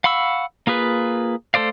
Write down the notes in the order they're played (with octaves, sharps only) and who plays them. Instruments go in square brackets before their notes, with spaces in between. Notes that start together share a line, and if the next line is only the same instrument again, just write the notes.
[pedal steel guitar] F5 F#5 B5 C#6 E6
A#3 F4 G#4 B4
A3 A4 C5 D5 F5